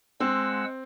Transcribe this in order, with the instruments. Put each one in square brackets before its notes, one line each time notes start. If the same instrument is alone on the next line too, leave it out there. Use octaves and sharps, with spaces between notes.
[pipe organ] G#3 F#5 E6 [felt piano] C4